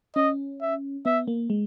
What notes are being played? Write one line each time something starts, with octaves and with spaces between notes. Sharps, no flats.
C#4 D#5
E5
B3 E5
A#3
G#3